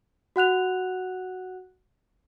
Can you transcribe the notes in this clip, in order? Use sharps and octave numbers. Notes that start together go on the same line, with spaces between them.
F#4 F#5 F#6 F7